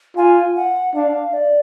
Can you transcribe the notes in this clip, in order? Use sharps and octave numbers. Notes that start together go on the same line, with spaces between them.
F4 G#5
F#5
D4 F5
D5